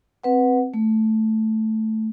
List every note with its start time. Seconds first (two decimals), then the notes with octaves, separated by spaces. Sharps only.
0.24 C4 B4 F#5
0.74 A3